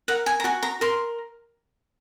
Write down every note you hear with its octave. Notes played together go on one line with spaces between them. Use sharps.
A#4 F#5
G#5
A#5
F#4 G#5
A#5
A#4 C6